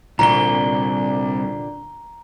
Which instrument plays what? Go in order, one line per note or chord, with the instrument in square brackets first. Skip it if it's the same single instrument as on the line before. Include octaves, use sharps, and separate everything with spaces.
[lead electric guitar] C2 [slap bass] A#2 D3 [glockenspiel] A#5 G7